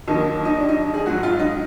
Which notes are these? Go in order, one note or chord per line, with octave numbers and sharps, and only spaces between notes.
D#2 D#3 F#3 D#4
D#4
D4
D#4
G#4
G#2 F#3 F#4
F4
D#4